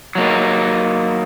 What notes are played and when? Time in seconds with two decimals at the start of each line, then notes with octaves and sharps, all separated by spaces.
0.15 F#3 A#3 D#4